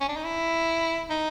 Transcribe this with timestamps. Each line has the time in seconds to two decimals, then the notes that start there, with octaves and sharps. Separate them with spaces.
0.01 C#4
0.09 D4
0.17 D#4
0.24 E4
1.10 D#4